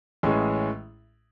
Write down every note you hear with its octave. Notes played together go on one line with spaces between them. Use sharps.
A1 A2 G#3 C#4 G#4